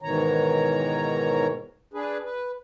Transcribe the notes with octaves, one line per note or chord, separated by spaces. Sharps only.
G#2 B2 D#3 E3 C#5 A#5
D4 G#4 B4
B4